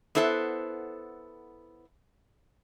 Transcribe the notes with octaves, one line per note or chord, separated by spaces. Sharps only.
B3 E4 A4 C5 F#5